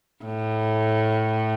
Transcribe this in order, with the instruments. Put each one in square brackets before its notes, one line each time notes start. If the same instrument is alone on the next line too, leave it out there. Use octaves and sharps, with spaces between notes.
[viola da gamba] A2